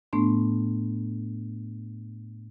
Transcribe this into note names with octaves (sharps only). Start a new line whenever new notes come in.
A2 A3 B3 D4 C6